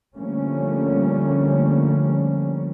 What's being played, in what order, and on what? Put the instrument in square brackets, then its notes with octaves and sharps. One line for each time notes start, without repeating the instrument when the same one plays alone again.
[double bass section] D3 F3 G3 A3 A#3 C#4